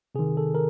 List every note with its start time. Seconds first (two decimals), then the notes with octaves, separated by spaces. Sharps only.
0.15 C3 D#3 G#4
0.37 A4
0.55 A#4